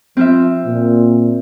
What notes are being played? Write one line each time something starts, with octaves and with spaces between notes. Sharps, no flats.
F3 C4 F4 E5
A#2